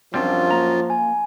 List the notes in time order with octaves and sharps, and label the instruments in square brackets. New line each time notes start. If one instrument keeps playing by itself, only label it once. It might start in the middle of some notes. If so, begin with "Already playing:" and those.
[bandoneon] F#2 F4 [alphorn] F3 [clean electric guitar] G3 C4 D4
[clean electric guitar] A#3 A#5
[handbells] G#5